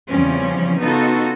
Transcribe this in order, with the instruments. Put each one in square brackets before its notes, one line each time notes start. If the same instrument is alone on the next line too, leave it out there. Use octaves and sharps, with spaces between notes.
[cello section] E2 C#3 F3 G3 C4 C#4
C#3 B3 D#4 F4 F#4 A4